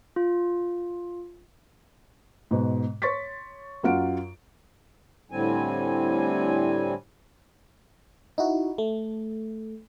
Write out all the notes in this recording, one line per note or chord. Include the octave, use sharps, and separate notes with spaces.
F4
G#2 B2
C#5 C6 C#6 A6 B6
F#2 F#3 F4 F5 F#5 D7
A2 D3 G3 C4 G#5
D#4 E4 F#4
A3